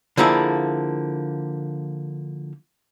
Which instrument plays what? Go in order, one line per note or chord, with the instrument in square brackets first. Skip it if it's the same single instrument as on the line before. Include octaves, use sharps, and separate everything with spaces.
[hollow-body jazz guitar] D3 F3 A#3 E4 G#4